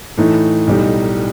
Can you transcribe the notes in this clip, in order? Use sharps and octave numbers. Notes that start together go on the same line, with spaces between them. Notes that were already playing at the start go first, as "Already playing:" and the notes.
A2 E3 A3 D#4
B1 A2 G3 D#4